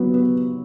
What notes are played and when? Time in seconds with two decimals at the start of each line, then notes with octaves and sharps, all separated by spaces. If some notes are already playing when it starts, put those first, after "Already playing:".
Already playing: F#3 B3
0.14 B3